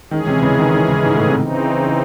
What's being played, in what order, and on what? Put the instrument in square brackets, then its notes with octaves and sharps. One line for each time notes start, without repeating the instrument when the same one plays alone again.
[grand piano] D#3 [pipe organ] E3 G#3 C#4 G#4
[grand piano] C3
C#3
D#3
D#3
C#3
G#2
A2
C3
[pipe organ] C#3 E3 C4 D#4